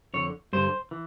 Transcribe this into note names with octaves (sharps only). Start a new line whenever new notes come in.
F2 D3 C#5
G2 D3 C5
E3